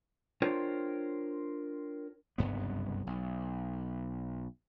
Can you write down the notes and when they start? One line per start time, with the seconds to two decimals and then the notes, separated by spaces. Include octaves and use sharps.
0.42 D4 F4 A#4 C5 C#5 G5
2.38 F#1 C2 G2 B3
3.07 B1